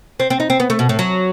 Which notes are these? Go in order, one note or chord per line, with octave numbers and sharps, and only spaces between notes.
C4
C4
D#4
C4
B3
A3
B2
A2
F#3